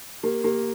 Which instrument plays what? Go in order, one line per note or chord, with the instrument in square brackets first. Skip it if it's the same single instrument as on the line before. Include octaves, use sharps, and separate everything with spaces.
[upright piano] A#3 [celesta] G4
[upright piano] A#3 [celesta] G4